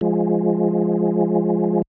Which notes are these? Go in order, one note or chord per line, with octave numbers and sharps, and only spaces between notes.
F3 G#3